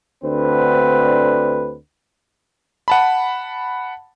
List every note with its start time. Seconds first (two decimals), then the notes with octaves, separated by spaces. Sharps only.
0.24 D2 D3 C4 D4 B4
2.88 F#5 A5 B5